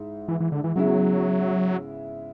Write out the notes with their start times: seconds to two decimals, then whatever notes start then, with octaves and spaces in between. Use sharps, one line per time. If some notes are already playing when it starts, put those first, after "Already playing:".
Already playing: G#2 E4
0.28 E3
0.41 E3
0.52 D3
0.64 E3
0.76 C#3 F#3 G#3 B3 E4 G#4